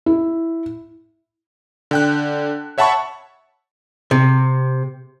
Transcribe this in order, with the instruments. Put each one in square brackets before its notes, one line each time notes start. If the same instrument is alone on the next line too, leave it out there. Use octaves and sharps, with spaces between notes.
[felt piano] E4
[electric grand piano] D3 G5 F#6
C#5 E5 F#5 A5 B5 C#6
[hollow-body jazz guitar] C3